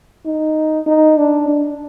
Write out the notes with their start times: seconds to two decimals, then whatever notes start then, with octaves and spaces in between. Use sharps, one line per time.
0.26 D#4
0.87 D#4
1.17 D4
1.48 D4